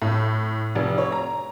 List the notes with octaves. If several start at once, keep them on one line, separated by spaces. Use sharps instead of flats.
A2
F1
C#5
A#5